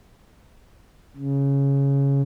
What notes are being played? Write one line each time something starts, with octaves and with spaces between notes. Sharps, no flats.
C#3